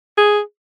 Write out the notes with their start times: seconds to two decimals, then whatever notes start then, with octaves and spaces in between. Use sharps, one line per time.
0.17 G#4